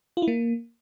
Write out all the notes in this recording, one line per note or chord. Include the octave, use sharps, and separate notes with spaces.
F4
E4
A#3